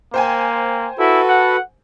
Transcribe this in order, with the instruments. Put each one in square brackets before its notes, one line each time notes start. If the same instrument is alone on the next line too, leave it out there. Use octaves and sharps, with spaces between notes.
[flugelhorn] A#3 [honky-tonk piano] C5 G5 G#5
[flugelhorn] E4 [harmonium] F#4 A4 B4
[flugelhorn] F#5